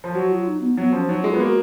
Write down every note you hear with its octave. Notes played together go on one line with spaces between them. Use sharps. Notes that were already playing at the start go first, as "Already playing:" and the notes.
F3
F#3 F#4
F4
D#4
B3
F#3 B3
F3 C#4
F#3 D#4
G#3 F4
B3
A#3 F#4